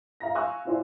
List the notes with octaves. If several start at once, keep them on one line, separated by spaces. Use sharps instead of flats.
F5 A#5 A#6
F5 G#5 C#6 E6 F#6
E4 F4 C5 D5 G#5 C6